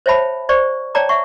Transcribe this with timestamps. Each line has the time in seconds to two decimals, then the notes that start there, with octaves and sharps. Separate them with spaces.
0.06 C5 C#5 E5 G5 A5 B5
0.49 C5 D5 C#6
0.95 C#5 D5 G5 A5 A#5 D6
1.09 E5 F#5 C#6